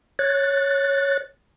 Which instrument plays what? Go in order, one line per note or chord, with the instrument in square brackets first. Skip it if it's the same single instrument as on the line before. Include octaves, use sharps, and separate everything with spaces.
[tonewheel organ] C#5 F#6 A6